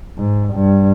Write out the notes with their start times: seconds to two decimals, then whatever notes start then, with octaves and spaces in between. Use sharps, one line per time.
0.18 G#2
0.54 G2